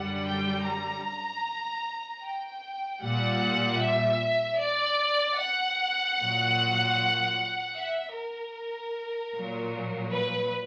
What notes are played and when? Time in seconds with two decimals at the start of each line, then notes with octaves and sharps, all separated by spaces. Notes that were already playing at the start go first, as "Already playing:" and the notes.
Already playing: F#2 D3 G3 F#5
0.26 G5
0.66 A#5
2.24 G5
3.03 A#2 G3 F#5
3.81 E5
4.60 D5
5.39 F#5
6.18 A#2 F#3
7.76 E5
8.15 A#4
9.33 A#2 F#3
10.13 B4